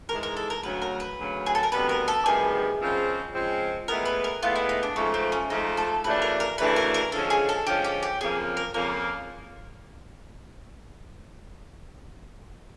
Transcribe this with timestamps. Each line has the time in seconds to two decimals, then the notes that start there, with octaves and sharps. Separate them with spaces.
0.09 G#2 E3 G#3 A#4
0.23 A#4
0.37 A4
0.50 A#4
0.63 D2 C#3 F#3 B4
0.82 A#4
1.00 B4
1.18 D2 C#3 F#3
1.46 G#4
1.55 A4
1.63 A#4
1.71 D2 C3 D#3 G3 B3 B4
1.89 A#4
2.08 A4
2.26 D2 C3 D#3 G3 B3 G#4
2.80 C#3 F3 G#3 C4
3.33 C#3 F3 G#3 C4
3.88 A2 E3 G#3 B3 A#4
4.05 B4
4.24 A#4
4.42 A2 E3 G#3 B3 F4
4.56 E4
4.69 D#4
4.83 D4
4.96 G#2 F3 A3 C#4
5.14 C4
5.32 C#4
5.50 G#2 F3 A3 D#4
5.77 A4
6.04 D2 C#3 E3 A3 D4 B4
6.22 A#4
6.40 A#4
6.58 D2 C#3 E3 A3 D4 B4
6.76 A#4
6.94 A#4
7.12 D3 F3 G#3 C#4 A4
7.30 G#4
7.49 A4
7.66 D3 F3 G#3 C#4 G4
7.84 G4
8.02 G4
8.21 F2 C#3 F3 A#3 G#4
8.57 A#4
8.74 F2 C#3 F3 A#3 A#4